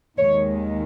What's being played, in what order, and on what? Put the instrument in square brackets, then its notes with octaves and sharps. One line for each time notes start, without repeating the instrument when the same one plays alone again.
[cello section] D#2 D#3 G#3 C#5